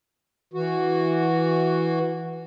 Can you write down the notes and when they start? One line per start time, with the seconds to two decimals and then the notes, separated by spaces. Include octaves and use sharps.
0.54 E3 F#4